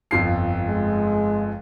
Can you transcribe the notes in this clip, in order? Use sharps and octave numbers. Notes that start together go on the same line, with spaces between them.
G1 F2 C7
G#3